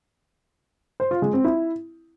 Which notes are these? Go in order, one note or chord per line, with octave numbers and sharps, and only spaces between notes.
C5
F4
G#3
C4
E4